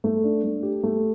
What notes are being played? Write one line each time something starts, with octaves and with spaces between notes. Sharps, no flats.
A3
D4
A3
G4
A3